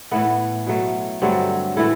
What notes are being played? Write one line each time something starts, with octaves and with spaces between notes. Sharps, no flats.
A2 E3 A3 B3
B2 F#3 A3
G2 D3 F#3 A3 C4
A2 E3 A3 E4